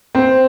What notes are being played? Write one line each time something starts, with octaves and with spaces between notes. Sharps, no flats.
C4